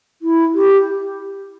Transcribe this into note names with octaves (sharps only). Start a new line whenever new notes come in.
E4
G4